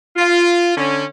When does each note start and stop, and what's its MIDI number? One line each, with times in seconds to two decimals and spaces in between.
0.16 0.72 65
0.76 1.05 50
0.76 1.05 61